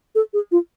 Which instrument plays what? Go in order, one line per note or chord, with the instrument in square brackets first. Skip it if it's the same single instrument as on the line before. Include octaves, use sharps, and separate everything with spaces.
[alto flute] A4
G#4
F4